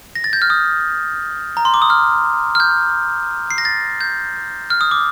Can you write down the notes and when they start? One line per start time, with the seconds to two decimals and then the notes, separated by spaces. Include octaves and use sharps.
0.15 A#6
0.24 A6
0.33 G6
0.42 F6
0.50 D#6
1.57 A#5
1.65 C6
1.74 D6
1.82 D#6
1.90 F6
2.55 F6
2.60 G6
3.51 C7
3.58 A#6
3.65 A6
4.01 G6
4.70 F6
4.81 D#6
4.91 D6